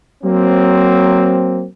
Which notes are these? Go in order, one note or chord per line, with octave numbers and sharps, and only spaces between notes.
F#3 A#3 C4